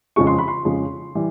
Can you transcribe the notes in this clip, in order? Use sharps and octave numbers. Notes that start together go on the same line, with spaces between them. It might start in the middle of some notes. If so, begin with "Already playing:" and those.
F2 C#3 F3 G#3 C#6
C6
B5
C6
F2 C#3 F3 G#3
E3 G3